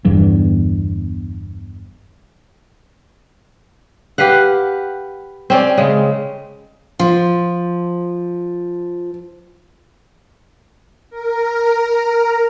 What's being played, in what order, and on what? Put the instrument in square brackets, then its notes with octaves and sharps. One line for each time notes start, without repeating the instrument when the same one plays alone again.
[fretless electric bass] G1 E2 G2
[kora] G4 B4 F5 F#5
C4 C#4 D5
C#3 G#3
[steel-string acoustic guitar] F3 [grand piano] F4
[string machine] A#4